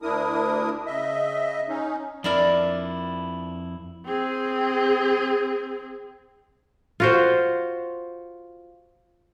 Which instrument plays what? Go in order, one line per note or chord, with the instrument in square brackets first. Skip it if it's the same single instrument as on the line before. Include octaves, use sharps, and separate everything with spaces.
[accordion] D2 D4 E4 A#4 D#6
C#3 D#5 E5
C#4 D#4
[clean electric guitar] F2 E4 [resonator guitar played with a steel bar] D4 A#4 D5
[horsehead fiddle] C4 G#4
[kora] F4 F#4 C5